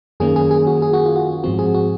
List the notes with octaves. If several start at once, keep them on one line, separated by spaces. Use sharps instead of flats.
F#2 D#3 A#3 C#4 G#4
G#4
G#4
F#4
G#4
F#4
F4
F#4
G#2 F3 C4 F#4
G#4
F#4